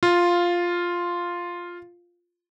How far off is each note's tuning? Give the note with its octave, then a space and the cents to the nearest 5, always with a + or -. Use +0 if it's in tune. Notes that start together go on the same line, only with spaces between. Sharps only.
F4 +0 F5 +0